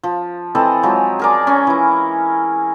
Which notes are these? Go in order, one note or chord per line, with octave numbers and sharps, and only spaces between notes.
F3
E3 C4 A4 D#5
F3 F#3 G#3
G#4 A#4 D5
C#4 C#6
E3 E4